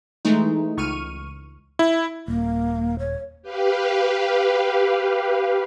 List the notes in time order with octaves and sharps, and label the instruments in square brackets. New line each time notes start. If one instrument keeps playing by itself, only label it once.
[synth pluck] E3 G#3 A3 D#4
C#2 C#6 F6 D#7
[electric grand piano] E4
[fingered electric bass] D#1 [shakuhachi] A#3
[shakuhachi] C#5
[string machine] G4 B4 F5